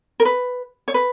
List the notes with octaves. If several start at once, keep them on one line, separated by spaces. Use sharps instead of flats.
A#4
B4
C#5
B4